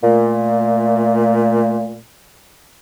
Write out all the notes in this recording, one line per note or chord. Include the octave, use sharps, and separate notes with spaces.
A#2 A3